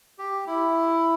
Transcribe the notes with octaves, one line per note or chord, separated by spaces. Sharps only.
G4
E4